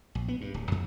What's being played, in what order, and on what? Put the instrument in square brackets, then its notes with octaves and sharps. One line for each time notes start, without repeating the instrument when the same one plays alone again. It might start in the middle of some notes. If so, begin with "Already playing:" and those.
[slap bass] A#1
B3
G2
D1
F2